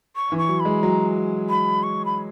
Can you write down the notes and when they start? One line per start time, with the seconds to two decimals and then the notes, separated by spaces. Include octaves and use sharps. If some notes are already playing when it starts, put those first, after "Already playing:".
0.16 C#6
0.32 E3
0.38 C#6
0.49 F#3
0.60 B5
0.65 G#3
0.83 F#3 A#5
1.50 B5
1.83 C#6
2.05 B5